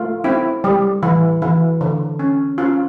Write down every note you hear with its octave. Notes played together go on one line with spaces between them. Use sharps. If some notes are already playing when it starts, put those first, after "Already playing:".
Already playing: A3 F4
C4 E4
G3
E3
E3
D3
C#4
C#4 F4